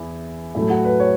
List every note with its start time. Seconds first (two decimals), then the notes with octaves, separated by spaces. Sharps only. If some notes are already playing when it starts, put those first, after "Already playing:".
Already playing: E2 E4
0.55 A2 F#3 A3 E4
0.70 F#4
0.85 B4
1.00 C#5